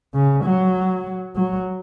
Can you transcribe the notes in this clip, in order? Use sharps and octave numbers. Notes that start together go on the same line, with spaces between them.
C#3
F#3
F#3